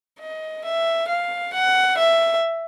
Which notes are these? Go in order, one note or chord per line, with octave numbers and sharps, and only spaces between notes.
D#5
E5
F5
F#5
E5